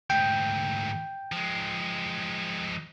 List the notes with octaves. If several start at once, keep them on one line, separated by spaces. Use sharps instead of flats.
D2 G#2 G5
F3 G#3